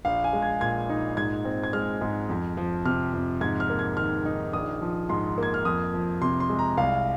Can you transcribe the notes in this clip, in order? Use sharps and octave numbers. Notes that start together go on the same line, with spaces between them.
A#1 F5
G#5
G#3
G#6
A#2 G#6
D#4
G#2 G#6
C4
G#6
G#3 F6
G#2
F2
F3
C3 F6
F2
G#2 G#6
F6
A#3
G#6
D#3 F6
D#4
A#1 D#6
F3
G#2 C6
A#3 G#6
F6
F2 D#6
F3
C3 C6
C6
G#3
A#5
C2 F5